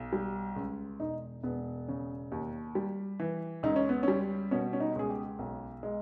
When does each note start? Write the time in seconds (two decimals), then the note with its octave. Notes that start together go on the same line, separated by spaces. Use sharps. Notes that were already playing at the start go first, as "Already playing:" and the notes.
Already playing: B1
0.13 G3
0.56 C#2
0.99 E1 D#4
1.43 E1 B3
1.88 C#3
2.32 D#2
2.75 G3
3.20 E3
3.63 C#2 D#4
3.76 C#4
3.89 B3
4.03 G3 C#4
4.51 B2 C#4
4.73 C#4
4.80 D#4
4.96 C#2 G#4
5.10 G4
5.39 B1
5.83 G#3